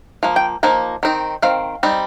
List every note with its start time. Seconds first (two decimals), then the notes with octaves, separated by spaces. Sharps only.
0.23 F3 A#3
0.36 G5
0.63 F3 A#3 D#4
1.03 D#3 C4 D#4
1.42 D#3 C4 F5
1.83 G3 C4 D#4